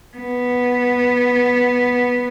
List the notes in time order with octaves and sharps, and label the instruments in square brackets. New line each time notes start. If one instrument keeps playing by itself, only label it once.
[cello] B3